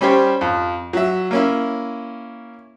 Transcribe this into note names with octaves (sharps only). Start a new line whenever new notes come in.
G3 C#4 G4 C5 C#5
F2
F#3 E5
A#3 C#4 E4